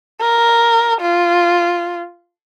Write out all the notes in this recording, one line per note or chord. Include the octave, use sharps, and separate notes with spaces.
A#4
F4